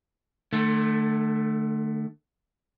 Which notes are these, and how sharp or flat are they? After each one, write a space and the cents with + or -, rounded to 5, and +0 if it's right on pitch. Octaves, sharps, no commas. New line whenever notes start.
D3 +45 A3 +0